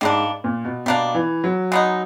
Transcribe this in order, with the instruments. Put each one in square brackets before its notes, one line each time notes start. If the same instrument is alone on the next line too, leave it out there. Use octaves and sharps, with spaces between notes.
[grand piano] G#2 [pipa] G3 A#3 D4
[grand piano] A#2
B2
[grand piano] B2 [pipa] G3 A#3 D4
[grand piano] E3
F#3
[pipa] G#3 B3 D#4